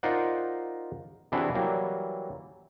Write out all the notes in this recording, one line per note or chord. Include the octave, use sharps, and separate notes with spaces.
D#4 F4 A#4 C5 D5 F#5
C3 E3 D4 E4 F#4 G#4
E3 F#3 G3 A#3